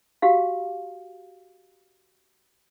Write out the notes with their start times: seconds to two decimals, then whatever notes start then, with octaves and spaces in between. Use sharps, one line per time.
0.22 F#4 G4 F5